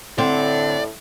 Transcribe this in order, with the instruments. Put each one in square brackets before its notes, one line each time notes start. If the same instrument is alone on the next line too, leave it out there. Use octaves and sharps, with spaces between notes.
[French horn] A2 [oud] D3 C4 [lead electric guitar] D5